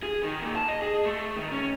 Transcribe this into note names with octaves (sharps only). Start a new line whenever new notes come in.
G#4
D#3
A#2
A5
D#5
G#4
A3
D#3
C#4